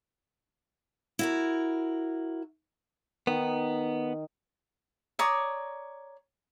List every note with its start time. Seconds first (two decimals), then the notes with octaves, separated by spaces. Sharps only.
1.19 E4 F#4 A#4
3.27 D#3 B3
5.19 C#5 D5 A#5 D#6